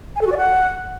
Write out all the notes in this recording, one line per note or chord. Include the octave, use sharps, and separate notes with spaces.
G#5
A4
F#4
D5
F#5